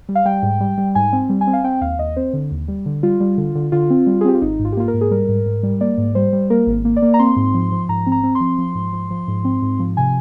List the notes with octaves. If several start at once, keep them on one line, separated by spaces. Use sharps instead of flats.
G3
F5
G3 G5
G#2
G3
G3
G#2 G#5
C4
G3
G#5
C4
F5
C4 G5
D#2 F5
D#2 D#5
C4 C5
D3
D#2
G3
D3
G3 F4
G3
D3
D3
D3 F4
C4
G3
G#4
C4 G4
F4
G#1 D#4
G#2
F4
G4
A#3 F4
A#4
G#2
G#4
G3 A#4
G#2
G#2
G3
A#3 D5
G#2
G3 C5
G3
A#3 A#4
G#1
A#3
D5
A#3
A#5
C4 C6
G#2
F3
F3
G#2 A#5
C4
A#5
C4
C6
F3
F3
G#2
F3
F3
G#2
C4
G#2
F3
C3 G#5